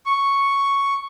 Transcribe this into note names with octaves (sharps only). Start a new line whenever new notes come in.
C#6